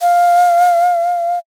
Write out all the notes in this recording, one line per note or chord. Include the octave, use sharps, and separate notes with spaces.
F5